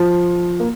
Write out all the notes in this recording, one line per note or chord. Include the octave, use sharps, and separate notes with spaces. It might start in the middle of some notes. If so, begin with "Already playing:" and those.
Already playing: F3
A#3